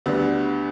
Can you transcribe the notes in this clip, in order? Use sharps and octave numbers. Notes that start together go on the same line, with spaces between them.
D2 D3 G3 B3